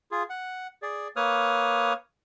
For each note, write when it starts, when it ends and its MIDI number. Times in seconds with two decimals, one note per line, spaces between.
0.11 0.23 65
0.11 0.23 68
0.30 0.67 78
0.82 1.08 68
0.82 1.08 74
1.16 1.93 58
1.16 1.93 71
1.16 1.93 73
1.16 1.93 87
1.16 1.93 89